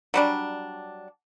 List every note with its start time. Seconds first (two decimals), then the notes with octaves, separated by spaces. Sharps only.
0.14 F#3 G3 D4